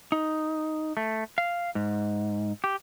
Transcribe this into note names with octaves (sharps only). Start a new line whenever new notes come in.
D#4
A3
F5
G#2
G4